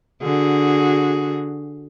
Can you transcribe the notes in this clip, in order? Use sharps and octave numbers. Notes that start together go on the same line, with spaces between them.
D3 F#4 G#4